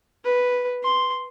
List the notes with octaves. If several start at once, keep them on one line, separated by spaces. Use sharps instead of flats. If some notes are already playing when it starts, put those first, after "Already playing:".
B4
C6